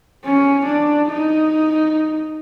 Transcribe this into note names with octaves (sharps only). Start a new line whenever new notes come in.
C#4
D4
D#4